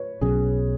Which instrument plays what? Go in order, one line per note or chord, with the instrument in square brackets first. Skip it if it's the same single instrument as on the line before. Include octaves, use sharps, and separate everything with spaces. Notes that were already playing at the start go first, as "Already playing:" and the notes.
Already playing: [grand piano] B4 C#5
[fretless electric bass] B1 B2 F#3 C#4 [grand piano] G#4